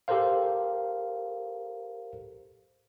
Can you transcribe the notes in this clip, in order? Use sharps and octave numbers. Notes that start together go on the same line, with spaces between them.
G4 A4 A#4 C5 F5